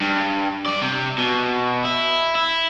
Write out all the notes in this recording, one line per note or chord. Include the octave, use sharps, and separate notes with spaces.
G2
G2 D5
C3
B2
E4
E4